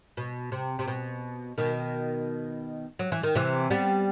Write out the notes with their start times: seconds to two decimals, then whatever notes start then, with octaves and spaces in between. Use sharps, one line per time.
0.17 B2
0.52 C3
0.79 C3
0.88 B2
1.58 B2 D#3
2.99 F#3
3.12 E3
3.23 D#3
3.35 C3 E3
3.70 G3 B3